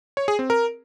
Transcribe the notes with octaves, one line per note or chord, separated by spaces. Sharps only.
C#5
G#4
C4
A#4